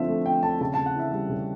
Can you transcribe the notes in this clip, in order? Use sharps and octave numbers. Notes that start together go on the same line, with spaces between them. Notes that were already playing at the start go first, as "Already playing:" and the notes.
Already playing: D3 F3 C4 E5
A3
C4 G5
D3 A5
C#3 A5
C#3 A5
F#5
E3 E5
G3 E5
C#3